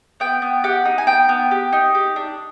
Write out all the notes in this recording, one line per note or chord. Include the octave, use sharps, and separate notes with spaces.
B3 G5
B3
G4 F#5
D#4
G#5
B3 G5
B3
G4
D#4
G4
D4